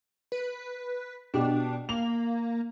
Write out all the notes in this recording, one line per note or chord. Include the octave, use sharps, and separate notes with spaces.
B4
B2 D4 G4
A#3 F7